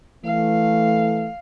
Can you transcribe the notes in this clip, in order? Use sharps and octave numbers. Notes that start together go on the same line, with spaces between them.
E3 A3 F5